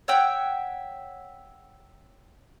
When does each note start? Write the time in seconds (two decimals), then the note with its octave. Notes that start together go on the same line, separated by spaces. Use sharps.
0.08 C#5 E5 F#5 G5